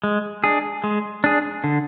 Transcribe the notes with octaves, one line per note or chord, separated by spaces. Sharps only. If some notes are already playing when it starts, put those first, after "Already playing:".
G#3
D4 G#4
G#3
D4 G#4
D3